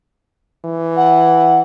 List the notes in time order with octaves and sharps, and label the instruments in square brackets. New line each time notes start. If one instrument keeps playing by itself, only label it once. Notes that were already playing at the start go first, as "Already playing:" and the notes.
[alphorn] E3
[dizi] F#5